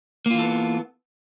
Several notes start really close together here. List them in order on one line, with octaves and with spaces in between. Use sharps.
A#3 F4 E3 A4 B3